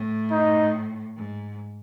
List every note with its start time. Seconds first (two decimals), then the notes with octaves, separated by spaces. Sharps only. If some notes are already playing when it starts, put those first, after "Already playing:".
Already playing: A2
0.31 D#4
1.16 G#2